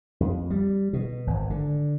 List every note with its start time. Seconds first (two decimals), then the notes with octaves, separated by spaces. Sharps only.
0.20 F2
0.50 G3
0.93 B2
1.27 G#1
1.50 D3